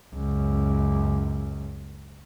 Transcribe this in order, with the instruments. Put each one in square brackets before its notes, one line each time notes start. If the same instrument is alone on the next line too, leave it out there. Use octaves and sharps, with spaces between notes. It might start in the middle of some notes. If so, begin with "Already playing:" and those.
[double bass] C#2 F#2